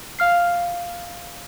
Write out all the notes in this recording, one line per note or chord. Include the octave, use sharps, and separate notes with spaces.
F5 F6 C7